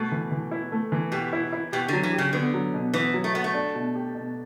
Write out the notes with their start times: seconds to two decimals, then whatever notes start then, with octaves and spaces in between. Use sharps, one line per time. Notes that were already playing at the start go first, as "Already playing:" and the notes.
Already playing: B2 A3
0.12 E3
0.32 E3
0.51 E4
0.72 A3
0.92 E3
1.12 B2 G4
1.33 E4
1.53 E4
1.72 B2 G4
1.88 D3 F#3
2.03 E3
2.13 G4
2.18 C#3
2.33 D3 B3
2.54 F#3
2.74 B2
2.94 E3 B3
3.14 F#3
3.24 A3
3.34 B3 F#4
3.44 A3
3.54 D4
3.75 B2
3.95 G4
4.15 B2